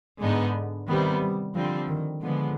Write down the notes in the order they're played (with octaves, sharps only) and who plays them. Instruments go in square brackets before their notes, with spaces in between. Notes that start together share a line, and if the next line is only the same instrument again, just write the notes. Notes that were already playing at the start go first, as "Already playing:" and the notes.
[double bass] G#2 [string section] D3 G#3 B3 D#4
[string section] C3 G3 B3 [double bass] D#3
[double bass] G3
[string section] D3 G3 C4 [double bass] F3
[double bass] D#3
[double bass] D3 [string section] F3 G#3 B3